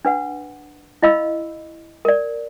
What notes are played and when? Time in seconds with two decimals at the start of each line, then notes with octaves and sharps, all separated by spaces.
0.05 D4 B4 F#5
1.02 E4 D#5 F5 B5 E6
2.05 A#4 D5